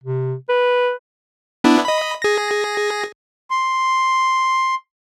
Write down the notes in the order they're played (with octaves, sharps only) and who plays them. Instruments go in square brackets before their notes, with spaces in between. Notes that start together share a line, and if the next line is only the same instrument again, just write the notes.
[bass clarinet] C3
B4
[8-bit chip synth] B3 D4 E4
D#5 B5
G#4 A#6
[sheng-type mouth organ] C6